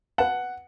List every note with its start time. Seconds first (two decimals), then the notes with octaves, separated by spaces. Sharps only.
0.18 B4 F5 F#5 A5